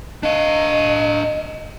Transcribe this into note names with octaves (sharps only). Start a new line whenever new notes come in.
D4 D#5 F5